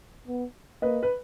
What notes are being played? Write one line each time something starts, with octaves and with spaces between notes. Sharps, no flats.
B3
A#3 B4 D#5
B4